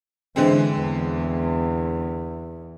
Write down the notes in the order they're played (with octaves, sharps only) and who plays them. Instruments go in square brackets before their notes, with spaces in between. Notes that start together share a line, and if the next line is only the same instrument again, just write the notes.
[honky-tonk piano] D3 G#3 C4 [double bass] E3
[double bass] E2